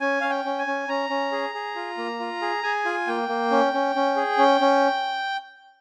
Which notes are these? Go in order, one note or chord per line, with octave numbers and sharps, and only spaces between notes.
C#4 G#5
C#4 F5
G5
C#4
G#5
C#4
C#4 A#5
C#4
G#4
G#4
F4
A#3
F4
G#4
G#4 G#5
F4
A#3 G5
A#3
C#4
C#4
C#4
G#4
C#4
C#4